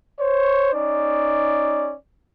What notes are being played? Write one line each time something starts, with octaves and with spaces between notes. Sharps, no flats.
C5 C#5
C#4 D#4 D5